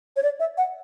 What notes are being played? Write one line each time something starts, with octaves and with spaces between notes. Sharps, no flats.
C#5
D5
E5
F#5